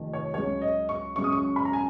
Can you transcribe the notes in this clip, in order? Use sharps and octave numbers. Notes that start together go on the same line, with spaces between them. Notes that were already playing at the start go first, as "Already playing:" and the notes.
Already playing: F1 F2 D#3
C#5
C#2 C#3 F#3 C#4 C#5
D#5
C#6
C#2 C#3 F#3 C#4 C#6
D#6
C#6
B5
A#5
G#5